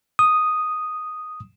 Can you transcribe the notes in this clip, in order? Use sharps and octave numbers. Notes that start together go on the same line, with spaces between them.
D#6